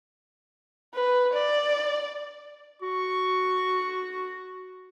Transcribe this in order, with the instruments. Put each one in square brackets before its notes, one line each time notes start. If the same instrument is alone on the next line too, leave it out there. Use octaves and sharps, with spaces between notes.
[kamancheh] B4
D5
[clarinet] F#4 [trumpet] C#6